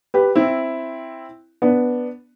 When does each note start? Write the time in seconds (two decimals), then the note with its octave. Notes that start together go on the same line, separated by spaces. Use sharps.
0.14 G4 B4
0.36 C4 E4
1.62 B3 D4